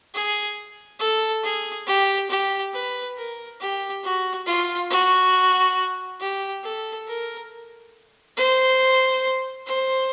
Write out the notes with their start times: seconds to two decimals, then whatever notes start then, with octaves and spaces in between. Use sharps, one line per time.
0.14 G#4
1.00 A4
1.43 G#4
1.87 G4
2.30 G4
2.73 B4
3.17 A#4
3.60 G4
4.03 F#4
4.46 F4
4.90 F#4
6.20 G4
6.63 A4
7.07 A#4
8.36 C5
9.66 C5